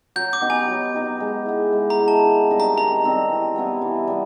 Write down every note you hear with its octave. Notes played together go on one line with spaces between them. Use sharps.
F#3 G6
D6
B3 D#4 G4
G#5
F#3
B3 D#4 G4
G#3
B3 E4
G#3
A#5
B3 E4
A5
D#3
G3 C4 D#4
A#5
D#3 A#5
G3 C4 D#4
E3
G3 B3 E4
E3
G3 B3